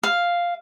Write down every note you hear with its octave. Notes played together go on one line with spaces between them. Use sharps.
F5